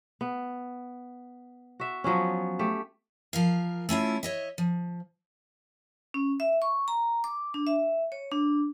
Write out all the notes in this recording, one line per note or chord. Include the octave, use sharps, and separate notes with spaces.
B3
F#4 E5
F3 F#3 B3 C#4
A3 G4
F3 A#4 F5
A3 C#4 E4 F4
C#5 D#5 E5
F3
C#4
E5
C#6
A#5
D6
D4
E5
C#5
D4